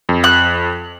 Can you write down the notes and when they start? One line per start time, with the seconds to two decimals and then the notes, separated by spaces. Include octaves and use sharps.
0.09 F2
0.24 F#6